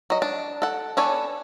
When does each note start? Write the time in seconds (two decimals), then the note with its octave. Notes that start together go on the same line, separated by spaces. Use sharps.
0.10 F#3 D#5
0.22 D4
0.62 A4 F#5
0.97 B3 D4 A4 C#5 G#5